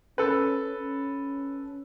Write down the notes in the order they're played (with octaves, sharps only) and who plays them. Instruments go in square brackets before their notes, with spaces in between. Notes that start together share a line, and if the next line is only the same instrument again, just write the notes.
[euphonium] C#4 [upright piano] A4 B4
[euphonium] C#4